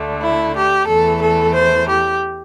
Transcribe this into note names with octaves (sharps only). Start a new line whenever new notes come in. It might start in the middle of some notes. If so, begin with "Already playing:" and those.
Already playing: D2 D3 A3
E4
G4
E2 E3 A3 A4
A4
C5
G4